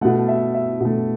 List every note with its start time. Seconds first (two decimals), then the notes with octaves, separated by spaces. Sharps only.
0.01 A3 F#5
0.05 B2
0.28 E5
0.54 E5
0.81 B2 A3